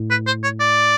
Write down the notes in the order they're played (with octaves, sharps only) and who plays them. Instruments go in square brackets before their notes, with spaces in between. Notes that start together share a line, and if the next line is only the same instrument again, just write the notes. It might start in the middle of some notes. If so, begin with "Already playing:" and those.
Already playing: [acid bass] A2
[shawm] B4
C5
C#5
D5